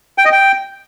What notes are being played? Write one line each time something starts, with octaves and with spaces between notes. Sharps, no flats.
G5
D#5
G5